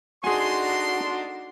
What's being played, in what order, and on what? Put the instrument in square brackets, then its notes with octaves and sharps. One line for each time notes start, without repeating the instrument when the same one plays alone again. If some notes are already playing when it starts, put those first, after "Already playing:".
[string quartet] D4 D#4 A4 [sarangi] F#4 [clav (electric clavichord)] G#4 G#5 [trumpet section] C6